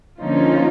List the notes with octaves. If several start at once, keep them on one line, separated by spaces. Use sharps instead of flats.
D3 F3 A#3 C#4 D#4 F4